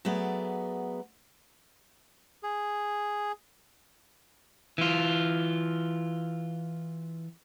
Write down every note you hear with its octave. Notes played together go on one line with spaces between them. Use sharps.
F#3 A3 B3 G#4 D5
G#4
E3 F4